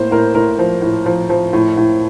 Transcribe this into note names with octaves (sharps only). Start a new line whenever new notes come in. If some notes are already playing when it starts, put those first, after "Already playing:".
Already playing: A2 A#3 C5
A2 A#4
A2 A#4
F3
A2
F3
F3
A2
A2